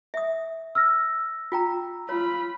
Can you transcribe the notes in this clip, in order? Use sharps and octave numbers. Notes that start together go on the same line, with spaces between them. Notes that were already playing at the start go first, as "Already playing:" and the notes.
E5 D#6
E6 F6 A#6
F4 G5 A#5
F4 C#5 B5